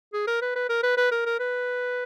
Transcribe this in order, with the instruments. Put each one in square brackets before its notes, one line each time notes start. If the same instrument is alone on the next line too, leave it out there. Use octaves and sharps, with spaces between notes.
[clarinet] G#4
A#4
B4
B4
A#4
B4
B4
A#4
A#4
B4